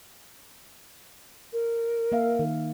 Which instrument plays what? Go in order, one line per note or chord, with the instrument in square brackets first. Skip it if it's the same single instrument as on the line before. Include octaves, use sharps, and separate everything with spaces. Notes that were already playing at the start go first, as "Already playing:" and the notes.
[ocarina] A#4
[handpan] A#3 E5 F5
D#3